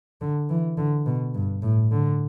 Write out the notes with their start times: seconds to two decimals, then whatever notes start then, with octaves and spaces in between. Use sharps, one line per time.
0.21 D3
0.50 E3
0.78 D3
1.07 B2
1.35 G2
1.63 A2
1.91 D3